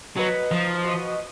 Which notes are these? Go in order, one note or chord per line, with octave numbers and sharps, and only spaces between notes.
F#3 F#4 B4 D#5
F3 D#4
F#4 B4 D#5